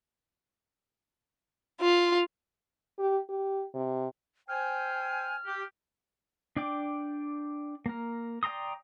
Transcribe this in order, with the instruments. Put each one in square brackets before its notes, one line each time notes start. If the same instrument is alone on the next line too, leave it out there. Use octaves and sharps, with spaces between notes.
[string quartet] F4
[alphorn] G4
G4
C3
[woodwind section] C5 G5 G#5 [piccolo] F6
[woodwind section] G4
[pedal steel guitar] D4 D5 G5 D6
A#3 A#4
D5 G5 A#5 C6 D#6